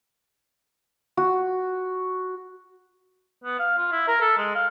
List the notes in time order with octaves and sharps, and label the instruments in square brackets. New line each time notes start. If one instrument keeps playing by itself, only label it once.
[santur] F#4
[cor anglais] B3
F5
F4
E4
A#4
A4
G#3
F5